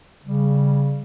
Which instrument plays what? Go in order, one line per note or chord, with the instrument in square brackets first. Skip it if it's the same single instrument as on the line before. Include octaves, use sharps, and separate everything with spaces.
[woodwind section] C#3 G3